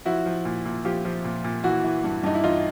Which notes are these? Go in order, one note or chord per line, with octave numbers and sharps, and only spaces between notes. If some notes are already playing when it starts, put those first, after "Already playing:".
F3 E4 F#4
F3
A#2
A#2
F3 F4 G4
F3
A#2
A#2
E3 E4 F#4
E3
G2
G2 D#4
E4
E3 D#4 F4